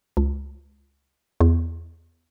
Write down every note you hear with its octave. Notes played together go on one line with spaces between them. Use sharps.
C#2
E2